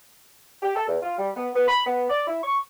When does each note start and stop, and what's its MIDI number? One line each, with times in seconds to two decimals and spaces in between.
0.62 0.73 67
0.76 0.87 69
0.88 0.97 40
1.02 1.13 65
1.18 1.30 55
1.36 1.48 59
1.55 1.66 59
1.67 1.86 83
1.86 2.06 59
2.09 2.24 74
2.27 2.39 64
2.43 2.58 85